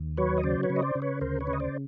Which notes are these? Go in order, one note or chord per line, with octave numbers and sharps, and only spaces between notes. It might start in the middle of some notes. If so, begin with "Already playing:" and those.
Already playing: D#2
F#3 B4 C#5
D#5
C#3 C5 D5
B4 C#5
C#3
D#5
C5 D5
C#3
B4 C#5
D2 A#4 C5
B4 C#5
C#3
D#5
C5 D5